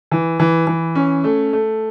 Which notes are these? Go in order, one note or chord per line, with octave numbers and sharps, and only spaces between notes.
E3
E3
E3
C#4
A3
A3